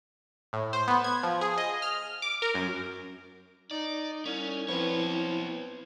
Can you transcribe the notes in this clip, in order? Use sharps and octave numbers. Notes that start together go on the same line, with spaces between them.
A2
C5
B3
G#6
F3
G#4
D#5
F6
D6
A#4
F#2
D#4 D5
C2 C#4
F3 B3 C4 E4 B4 C#5